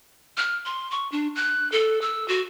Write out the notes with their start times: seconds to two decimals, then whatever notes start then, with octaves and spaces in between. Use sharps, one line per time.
0.37 F6
0.66 C6
0.91 C#6
1.12 D4
1.36 F#6
1.72 A4
2.02 E6
2.28 F#4